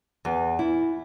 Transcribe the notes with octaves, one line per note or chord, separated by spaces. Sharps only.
E2
E4